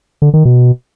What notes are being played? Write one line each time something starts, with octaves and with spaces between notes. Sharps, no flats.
D3
D#3
B2